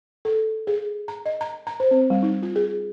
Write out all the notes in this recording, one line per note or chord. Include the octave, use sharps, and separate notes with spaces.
A4
G#4
A#5
D#5
A#5
A#5
C5
C4
G3
D#4
F4
G#4